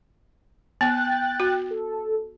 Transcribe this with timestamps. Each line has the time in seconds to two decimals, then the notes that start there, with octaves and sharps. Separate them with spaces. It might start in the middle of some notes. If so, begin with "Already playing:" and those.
0.81 B3 G5 F#6 A6
1.40 F#4
1.71 A4